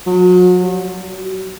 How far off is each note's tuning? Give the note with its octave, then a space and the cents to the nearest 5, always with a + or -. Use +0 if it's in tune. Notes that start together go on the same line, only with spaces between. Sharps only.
F#3 -35
F#3 +35